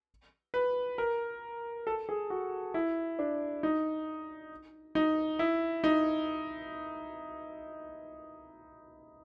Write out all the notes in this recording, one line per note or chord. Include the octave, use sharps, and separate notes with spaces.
B4
A#4
A4
G#4
F#4
E4
D4
D#4
D#4
E4
D#4